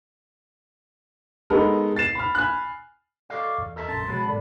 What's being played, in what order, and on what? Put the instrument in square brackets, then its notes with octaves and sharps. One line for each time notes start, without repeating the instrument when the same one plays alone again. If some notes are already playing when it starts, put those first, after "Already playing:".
[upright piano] G#3 B3 D#4 A4 A#4
A6 C7 E7
B5 F6
G#5 B5 F#6
[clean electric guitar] A4 D#5 F5 [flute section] D5 C#6 D6
[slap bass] E2
[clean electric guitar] A4 A#4 E5 [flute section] D#5 A5
[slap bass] A#1 F#2 C#4 [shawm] A5 [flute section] C6
[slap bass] B2 F3 F#3 [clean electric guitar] G#3 B3 [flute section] F#4 C#5 B5
[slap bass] G#2 F#3 C#4 [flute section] A4 A#4 D5